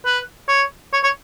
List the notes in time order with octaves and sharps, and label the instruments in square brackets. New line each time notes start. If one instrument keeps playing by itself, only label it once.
[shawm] B4
C#5
C#5
C#5